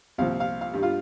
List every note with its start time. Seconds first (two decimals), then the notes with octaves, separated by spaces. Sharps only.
0.18 C2 A#2 F3 F5
0.40 F5
0.61 F5
0.74 G2 G3
0.82 F4 F5